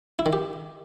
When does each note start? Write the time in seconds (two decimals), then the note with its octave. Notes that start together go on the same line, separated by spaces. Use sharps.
0.19 E4
0.26 D#3
0.33 G4